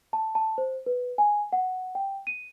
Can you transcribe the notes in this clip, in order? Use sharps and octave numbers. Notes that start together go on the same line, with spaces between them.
A5
A5
C5
B4
G#5
F#5
G5
D#7